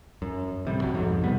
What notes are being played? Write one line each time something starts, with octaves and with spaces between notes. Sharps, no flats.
F#2
A1 C3 G3
C2 F#2 F3 F#3
B1 F2 G#2
C3 D#3 G3 B3